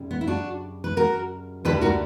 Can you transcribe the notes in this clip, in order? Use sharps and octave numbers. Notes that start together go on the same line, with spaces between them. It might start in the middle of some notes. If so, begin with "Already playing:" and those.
Already playing: F#2 C#3 G3
B3
E4
D4 F#4
B4
F#4 A#4
D2 D3 G3 G4 B4
F#4 A#4